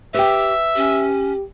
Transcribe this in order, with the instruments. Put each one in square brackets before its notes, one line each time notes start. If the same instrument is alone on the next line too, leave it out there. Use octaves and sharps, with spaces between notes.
[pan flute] G4 [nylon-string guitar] B4 G5 [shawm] E5
[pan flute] C#4 [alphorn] G4